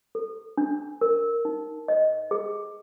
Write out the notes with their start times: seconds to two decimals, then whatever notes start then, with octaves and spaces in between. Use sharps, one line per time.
0.15 A4
0.57 D4
1.01 A#4
1.45 D#4
1.88 D#5
2.31 G#4